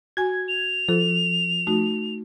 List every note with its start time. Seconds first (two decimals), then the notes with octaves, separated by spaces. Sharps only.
0.17 F#4 G#5 G#6
0.48 F7
0.89 F3 A4
1.67 A3 D#4 F#4